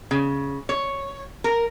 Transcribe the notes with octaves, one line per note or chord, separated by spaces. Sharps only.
C#3
C#5
A#4